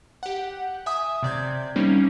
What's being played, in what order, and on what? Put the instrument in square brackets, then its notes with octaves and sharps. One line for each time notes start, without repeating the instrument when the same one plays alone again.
[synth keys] G4 F#5
E5 G#5 D#6
C3 D5 G6 G#6
G3 A#3 C4 C#4 D#4